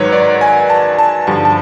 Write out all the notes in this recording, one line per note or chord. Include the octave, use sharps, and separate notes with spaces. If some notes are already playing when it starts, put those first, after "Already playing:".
Already playing: G#2 D#3 F#3 B4 C#5
D5
G#5
A5
A5
G2 D3 F3 A5
A5